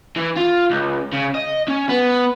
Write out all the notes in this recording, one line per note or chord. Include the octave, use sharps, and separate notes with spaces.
E3
F4
C#2
C#3
D#5
C#4
B3